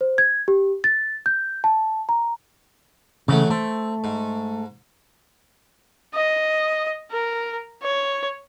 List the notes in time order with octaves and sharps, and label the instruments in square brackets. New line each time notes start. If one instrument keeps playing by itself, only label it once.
[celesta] C5
G#6
G4
A6
G6
A5
A#5
[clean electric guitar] C#3 [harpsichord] E3 F#3 A3
[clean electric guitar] A3 [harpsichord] C4
[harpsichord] G#2
[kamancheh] D#5
A#4
C#5